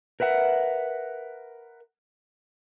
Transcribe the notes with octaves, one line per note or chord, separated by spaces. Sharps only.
A#4 B4 E5 F#5